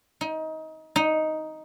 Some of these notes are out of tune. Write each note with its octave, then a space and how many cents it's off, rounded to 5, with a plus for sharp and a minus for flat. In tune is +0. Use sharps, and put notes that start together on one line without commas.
D#4 +25
D#4 +5